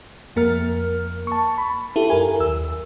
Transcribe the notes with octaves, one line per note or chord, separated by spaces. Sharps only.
F2 A#3 A#4 F6
A5 C#6
B5
E4 G4 A4
F#2 A#4 G#5
D#2 E6